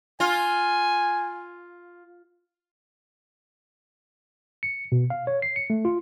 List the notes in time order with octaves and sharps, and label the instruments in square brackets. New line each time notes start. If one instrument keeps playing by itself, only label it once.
[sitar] F4 [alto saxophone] G#5
[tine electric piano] C#7
B2
F5
C#5
C7
C#7
A3
F4